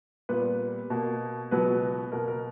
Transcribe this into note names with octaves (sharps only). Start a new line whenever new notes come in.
A#2 G3 B3 B4
B2 A#3
C#2 B2 F#3 B3 B4
B2 A#3 A#4
A#4